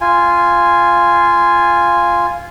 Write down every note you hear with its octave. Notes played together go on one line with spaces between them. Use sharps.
F4 G#5